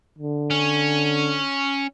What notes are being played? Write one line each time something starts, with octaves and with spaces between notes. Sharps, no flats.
D3
C#4